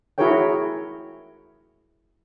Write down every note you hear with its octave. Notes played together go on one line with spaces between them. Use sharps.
E4 F#4 G#4 A#4 C#5 G5